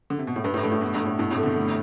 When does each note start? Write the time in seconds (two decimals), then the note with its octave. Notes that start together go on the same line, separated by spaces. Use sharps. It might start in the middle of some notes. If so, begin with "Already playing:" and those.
0.10 D3
0.19 C3
0.27 B2
0.36 A2
0.44 G2 B4
0.54 A2
0.63 G2 A3
0.72 A2
0.81 G2 B2 A3
0.94 G2
1.00 A3
1.06 A2
1.18 G2 B2 E4
1.31 A2 C3
1.37 A4
1.43 B2 D3
1.55 A2